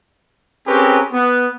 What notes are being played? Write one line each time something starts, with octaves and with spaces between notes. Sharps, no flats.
C4 C#4 G4 G#4 A#4 B4
B3